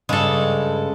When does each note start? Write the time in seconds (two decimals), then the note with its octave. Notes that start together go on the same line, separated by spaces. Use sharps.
0.09 G2 C#3 G#3 A4